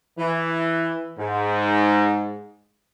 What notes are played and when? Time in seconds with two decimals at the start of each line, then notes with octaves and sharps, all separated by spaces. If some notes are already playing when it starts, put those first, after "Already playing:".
0.18 E3
1.19 G#2